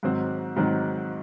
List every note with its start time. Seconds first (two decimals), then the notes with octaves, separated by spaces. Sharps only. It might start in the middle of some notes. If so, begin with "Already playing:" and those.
0.03 G#2 D#3 F#3 C4
0.56 G#2 D#3 F#3 C4